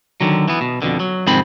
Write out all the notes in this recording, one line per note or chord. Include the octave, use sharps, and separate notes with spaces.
D3 D#3 F#3
E3 B3
B2
F2 B2 D3
F#3
F2 G#2 C3 D#3 C4 B5